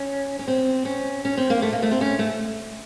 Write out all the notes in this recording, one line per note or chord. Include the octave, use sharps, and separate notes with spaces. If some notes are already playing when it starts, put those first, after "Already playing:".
Already playing: C#4
C#4
C4
C#4
C#4
C4
A#3
A3
A#3
A3
C4
C#4
A3